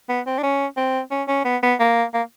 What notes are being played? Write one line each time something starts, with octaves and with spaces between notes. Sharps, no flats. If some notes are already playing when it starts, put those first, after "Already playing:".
B3
C4
D4
C#4
C4
C#4
C#4
B3
B3
A#3
A#3